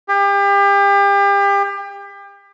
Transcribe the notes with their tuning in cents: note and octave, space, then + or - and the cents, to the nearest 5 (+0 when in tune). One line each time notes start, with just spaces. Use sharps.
G4 +35